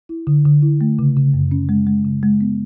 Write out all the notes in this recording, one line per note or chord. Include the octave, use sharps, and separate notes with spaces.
E4
D3
D3
E4
A3
C#3
C#3
F#2
C#4
G#3
G#3
C#3
G#3
B3